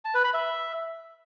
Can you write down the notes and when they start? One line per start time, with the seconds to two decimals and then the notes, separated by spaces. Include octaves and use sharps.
0.05 A5
0.14 B4
0.24 B5
0.34 E5